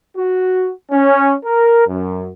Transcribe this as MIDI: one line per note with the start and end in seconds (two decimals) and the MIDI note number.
0.17 0.71 66
0.92 1.33 61
1.45 1.83 70
1.88 2.29 42